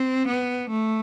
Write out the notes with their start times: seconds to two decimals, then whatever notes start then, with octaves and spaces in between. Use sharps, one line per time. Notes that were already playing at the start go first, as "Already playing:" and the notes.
Already playing: C4
0.27 B3
0.70 A3